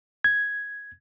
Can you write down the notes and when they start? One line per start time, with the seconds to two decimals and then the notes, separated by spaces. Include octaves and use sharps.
0.24 G#6